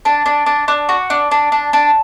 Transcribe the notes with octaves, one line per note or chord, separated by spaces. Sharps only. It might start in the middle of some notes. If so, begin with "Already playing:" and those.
D4
D4
D4
D4
F#4
D4
D4
D4
D4